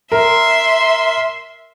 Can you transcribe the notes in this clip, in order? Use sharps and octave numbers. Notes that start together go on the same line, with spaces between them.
A#4 E5 C6